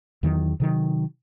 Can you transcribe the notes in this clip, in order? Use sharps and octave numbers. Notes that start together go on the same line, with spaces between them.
E2 D#3 F#3
C3 D#3 F#3